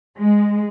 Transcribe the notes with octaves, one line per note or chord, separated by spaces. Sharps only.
G#3